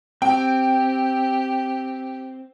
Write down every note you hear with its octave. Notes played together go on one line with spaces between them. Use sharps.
C4 G4 G5